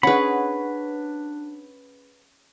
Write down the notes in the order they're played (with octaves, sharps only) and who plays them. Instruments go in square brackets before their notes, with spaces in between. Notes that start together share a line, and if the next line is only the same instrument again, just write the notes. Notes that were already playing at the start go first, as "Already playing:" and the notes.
[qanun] C#4 G#4 [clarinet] D4 [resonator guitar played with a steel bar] B4 F#5 [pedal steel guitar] B5